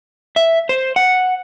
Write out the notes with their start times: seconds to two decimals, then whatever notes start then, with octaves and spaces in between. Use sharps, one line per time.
0.36 E5
0.69 C5
0.96 F#5